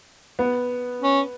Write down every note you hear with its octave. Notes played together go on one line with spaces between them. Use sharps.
B3
C#4